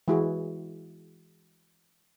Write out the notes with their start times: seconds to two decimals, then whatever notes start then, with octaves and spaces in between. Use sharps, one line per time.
0.08 E3 G#3 E4 F#4 G#4